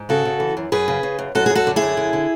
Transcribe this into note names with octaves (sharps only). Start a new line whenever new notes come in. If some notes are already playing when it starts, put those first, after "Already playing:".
Already playing: G#2
C#3 F#4 A4
C#3
E3
F#2
F#2 G#4 B4
C#3
C#3
F#2
F#2 F#4 A4
F#2 G#4
F#4 A4
D3
E4 G#4
F#2
D3
D3